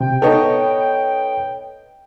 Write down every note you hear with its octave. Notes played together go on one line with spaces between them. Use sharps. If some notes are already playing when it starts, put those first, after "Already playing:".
C3 G5
B3 D#4 A4 C#5